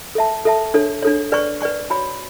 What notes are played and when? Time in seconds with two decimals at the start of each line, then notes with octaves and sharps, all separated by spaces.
0.15 A4 E5 A5
0.45 A4 E5 A5
0.74 D4 A4 C#5
1.02 D4 A4 C#5
1.32 B4 D5 G#5 C#6
1.61 B4 D5 G#5 C#6
1.90 F#4 C#5 G#5 B5